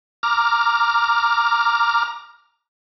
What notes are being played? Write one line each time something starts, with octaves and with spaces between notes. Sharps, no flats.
A#5 D6 F6